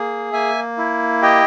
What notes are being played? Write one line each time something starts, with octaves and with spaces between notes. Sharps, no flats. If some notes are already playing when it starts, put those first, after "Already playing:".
Already playing: A#3 G#4
A#3 E5 G#5
E4
G4 D#5 G5